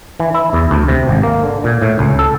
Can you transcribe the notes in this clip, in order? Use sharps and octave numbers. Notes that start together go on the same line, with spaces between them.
E3
E4
E2
D2
C3
G#1
A#3
D3
A#2
A2
C#2
A4